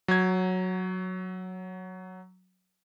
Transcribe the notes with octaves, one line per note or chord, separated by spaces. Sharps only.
F#3 G#6